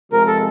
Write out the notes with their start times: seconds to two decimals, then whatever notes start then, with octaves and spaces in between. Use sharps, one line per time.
0.12 C3 F3 G#3 A#4
0.27 A4